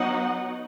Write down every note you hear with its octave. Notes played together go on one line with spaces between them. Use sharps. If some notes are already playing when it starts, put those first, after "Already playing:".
Already playing: F#3 B3 D#4 D#5 F#5